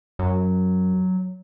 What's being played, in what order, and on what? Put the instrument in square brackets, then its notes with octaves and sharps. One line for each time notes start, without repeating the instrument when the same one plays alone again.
[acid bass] F#2 [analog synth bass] F#3